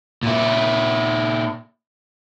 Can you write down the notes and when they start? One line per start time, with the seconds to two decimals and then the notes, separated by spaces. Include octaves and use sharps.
0.23 A#2 E4